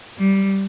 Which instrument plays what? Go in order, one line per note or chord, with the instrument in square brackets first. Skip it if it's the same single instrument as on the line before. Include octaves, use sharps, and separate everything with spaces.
[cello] G3